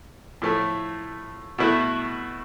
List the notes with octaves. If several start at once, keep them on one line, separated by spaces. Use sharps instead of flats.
A2 F3 A3
B2 A3 E4